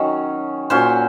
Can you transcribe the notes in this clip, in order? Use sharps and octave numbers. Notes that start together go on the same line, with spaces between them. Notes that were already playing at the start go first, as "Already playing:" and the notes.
Already playing: D#3 F#3 C#4
A#2 F#3 C#4 C5